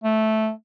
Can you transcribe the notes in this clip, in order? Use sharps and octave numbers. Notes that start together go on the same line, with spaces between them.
A3